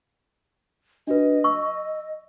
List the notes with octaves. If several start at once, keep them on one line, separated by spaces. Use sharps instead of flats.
D4 F#4 B4 D#5
C#6 E6